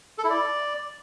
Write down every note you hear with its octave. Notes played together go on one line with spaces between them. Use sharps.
A4
E4
D5